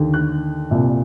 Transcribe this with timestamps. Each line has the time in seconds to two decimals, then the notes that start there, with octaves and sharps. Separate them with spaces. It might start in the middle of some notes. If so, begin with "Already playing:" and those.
Already playing: D#2 D3
0.14 F#6
0.71 C2 A#2